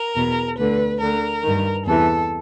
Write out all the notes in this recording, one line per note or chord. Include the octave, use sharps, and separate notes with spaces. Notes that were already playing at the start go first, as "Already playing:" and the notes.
Already playing: A#4
E2 B2
D2 D3 B4
D2 D3 A#4
G2 D#3
E2 C3 E3 A4